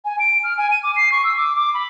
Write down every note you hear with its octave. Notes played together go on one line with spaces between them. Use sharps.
G#5
D7
F6
G#5
D#7
D6
C7
C#6
E6
D6
D6
B5